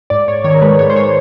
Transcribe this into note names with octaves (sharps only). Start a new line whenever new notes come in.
G#2 D5
G#2 C#5
D#3 C#5
A#4
G#3 B4
G#2 C#5
C5
C#5